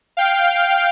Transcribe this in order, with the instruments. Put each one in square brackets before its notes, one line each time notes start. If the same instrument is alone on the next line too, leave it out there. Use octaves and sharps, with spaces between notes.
[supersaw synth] F5 G5